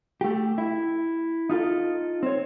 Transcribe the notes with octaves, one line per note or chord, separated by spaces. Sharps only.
A3 G4
E4
D#4 F4 G#4 A4
C4 C#5